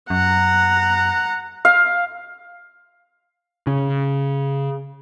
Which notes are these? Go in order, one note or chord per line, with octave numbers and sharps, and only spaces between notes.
F#2 F#5 A#5
F5
C#3